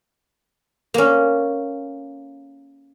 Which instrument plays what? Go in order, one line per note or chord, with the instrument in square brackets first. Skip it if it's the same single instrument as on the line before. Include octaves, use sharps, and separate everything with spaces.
[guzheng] A#3 C#4